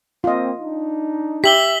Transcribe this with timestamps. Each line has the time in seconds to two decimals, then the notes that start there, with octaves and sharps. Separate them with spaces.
0.24 A#3 C4 F4 D#5
0.60 D4 D#4
1.44 G4 E5 B6 F#7 G7